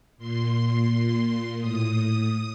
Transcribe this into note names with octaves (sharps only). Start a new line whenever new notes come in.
A#2 C6
A#2
A2 D#6